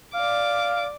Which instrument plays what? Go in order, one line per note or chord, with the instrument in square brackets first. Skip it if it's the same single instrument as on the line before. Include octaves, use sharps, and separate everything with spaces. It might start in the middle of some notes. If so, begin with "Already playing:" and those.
[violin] D5 D6 [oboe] F5